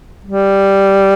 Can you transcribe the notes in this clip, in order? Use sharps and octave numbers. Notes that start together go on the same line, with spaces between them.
G3